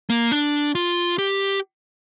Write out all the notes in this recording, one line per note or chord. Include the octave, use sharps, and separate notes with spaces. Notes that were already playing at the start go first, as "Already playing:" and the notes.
A#3
D4
F4
G4